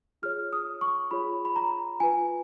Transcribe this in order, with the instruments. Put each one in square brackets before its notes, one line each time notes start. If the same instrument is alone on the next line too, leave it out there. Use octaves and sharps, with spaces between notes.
[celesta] F4 G#4 C#5 F6
D#6
C#6
F4 G#4 C#5 B5
B5
A#5
F4 B4 G#5